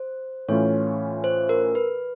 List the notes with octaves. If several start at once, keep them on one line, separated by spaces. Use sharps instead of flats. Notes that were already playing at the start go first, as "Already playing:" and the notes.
Already playing: C5
A2 E3 A3 C#4 F4 C#5
C5
A#4
B4